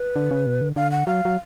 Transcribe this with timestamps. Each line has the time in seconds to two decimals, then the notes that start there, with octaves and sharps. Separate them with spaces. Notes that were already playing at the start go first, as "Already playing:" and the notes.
Already playing: B4
0.16 D3
0.31 C#3
0.46 B2
0.61 D3
0.76 D3 F5
0.91 F#5
1.07 F#3 F5
1.25 F#3